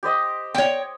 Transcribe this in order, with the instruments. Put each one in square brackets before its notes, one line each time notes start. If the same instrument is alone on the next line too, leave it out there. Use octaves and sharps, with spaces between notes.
[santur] G4 C5 D#5
[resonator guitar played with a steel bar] C#5 G5